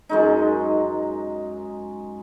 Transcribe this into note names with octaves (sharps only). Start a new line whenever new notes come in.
F#2 G#3 D#4